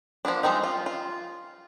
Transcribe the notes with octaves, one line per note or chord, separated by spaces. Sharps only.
F3 A#3 B3 D4
F3 G3 G#3 C4 D#4
F4
F4